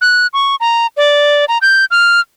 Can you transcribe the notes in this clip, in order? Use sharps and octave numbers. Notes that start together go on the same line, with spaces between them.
F#6
C#6
A#5
D5
A#5
G6
F6